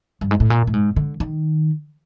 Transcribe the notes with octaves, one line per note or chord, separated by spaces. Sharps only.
G2
G#2
A2
A#2
A2
G#2
D3
D#3